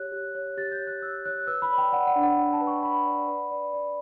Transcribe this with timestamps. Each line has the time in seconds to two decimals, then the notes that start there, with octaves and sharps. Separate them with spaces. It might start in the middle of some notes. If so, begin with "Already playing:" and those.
Already playing: G4 C#5 F#6
0.12 G4
0.35 C#5
0.57 G4 A6
0.72 G6
0.80 C#5
0.87 F#6
1.02 C#5 E6
1.25 C#5 F#6
1.47 B4 E6
1.62 B5
1.71 D5
1.78 G5
1.92 D5 F#5
2.07 F#5
2.16 D4
2.23 F#5
2.37 D4
2.53 A5
2.61 B4
2.67 C#6
2.83 B4 B5
3.06 D5
3.27 B4
3.51 D5
3.73 D5